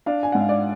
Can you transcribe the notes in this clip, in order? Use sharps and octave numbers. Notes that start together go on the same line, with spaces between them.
D4 F5
G#5
G#2 F#5
F5
D5